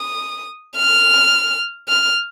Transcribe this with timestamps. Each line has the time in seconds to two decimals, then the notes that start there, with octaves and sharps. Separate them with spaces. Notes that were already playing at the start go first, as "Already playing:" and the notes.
Already playing: D#6
0.76 F6
1.88 F6